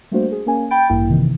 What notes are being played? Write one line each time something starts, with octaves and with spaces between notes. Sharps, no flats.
G3 A3 A#3 D4 F#4 C5
G#4
A#3 C#4 G#5
G5 B5 G6 A6 D7
A1 G2 A#3 E4 G5
C3 D#3 E3